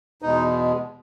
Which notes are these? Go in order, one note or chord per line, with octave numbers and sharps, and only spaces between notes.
E2 B2 G#3 D#4